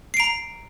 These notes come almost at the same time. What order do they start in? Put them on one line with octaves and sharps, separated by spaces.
C7 D7 A#5